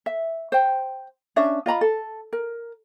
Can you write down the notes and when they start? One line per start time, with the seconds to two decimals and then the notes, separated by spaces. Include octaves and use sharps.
0.06 E5
0.52 C5 G5
1.36 C#4 D4 E5
1.66 F4 D#5 A#5 B5
1.81 A4
2.33 A#4